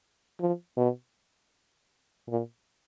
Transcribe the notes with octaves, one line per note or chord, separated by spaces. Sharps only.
F3
B2
A#2